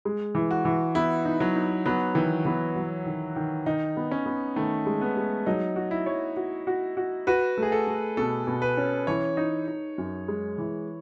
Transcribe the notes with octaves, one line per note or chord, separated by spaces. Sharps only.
G#3
E3
F#4
E3
B3 E4
D#4
F#3
D#4
F#3 B3
D#3 E3
E3 B3
F#3
D#3
D#3
D#3 D#4
B3
C#4
B3
D#3 A3
G#3
B3
G#3
F#3 D#4
F#4
E4
C#5
F#4
F#4
F#4
F#4 B4
A3
G#4
A4
A3
B2 A4
B2
B4
C#4
E3 C#5
D#4
D#4
F#2
G#3
E3